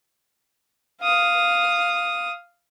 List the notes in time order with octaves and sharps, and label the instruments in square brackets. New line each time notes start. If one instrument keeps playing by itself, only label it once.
[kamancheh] F5 D#6